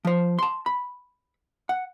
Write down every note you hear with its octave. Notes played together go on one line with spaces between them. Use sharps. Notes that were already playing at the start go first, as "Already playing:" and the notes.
F3 C5
A5 C6
B5
F#5